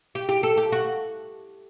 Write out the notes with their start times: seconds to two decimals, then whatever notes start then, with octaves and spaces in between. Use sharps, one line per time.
0.15 G4
0.29 G4
0.43 A4
0.57 G4
0.72 F#4